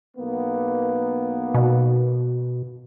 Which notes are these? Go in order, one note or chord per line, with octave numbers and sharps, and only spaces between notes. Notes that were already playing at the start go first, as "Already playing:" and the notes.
B1 A#3 B3
B2